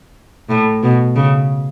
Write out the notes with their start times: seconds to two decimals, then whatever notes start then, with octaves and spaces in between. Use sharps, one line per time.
0.50 A2
0.83 B2
1.16 C#3